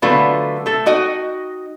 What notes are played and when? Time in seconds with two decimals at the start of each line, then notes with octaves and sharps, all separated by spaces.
0.02 D3 F#3 A3 B3 F4 B4
0.66 A3 A4
0.86 D#4 F#4 D#5 G5